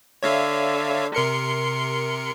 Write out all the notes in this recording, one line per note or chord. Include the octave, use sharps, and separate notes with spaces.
D3 C#5 E5 F5
C3 A#4 C6 C#7